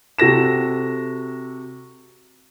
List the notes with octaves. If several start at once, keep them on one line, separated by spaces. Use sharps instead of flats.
C3 F#4 A4 A#6 E7